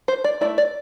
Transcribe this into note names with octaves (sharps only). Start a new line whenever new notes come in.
C5
D5
A3 C4 E4 D5
D5